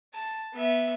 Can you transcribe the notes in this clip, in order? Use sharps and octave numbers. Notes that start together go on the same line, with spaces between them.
A5
B3 E5